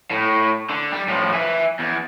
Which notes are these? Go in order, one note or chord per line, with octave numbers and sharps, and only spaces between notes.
A2
D3
G3
A2 F3
E5 G#5
E2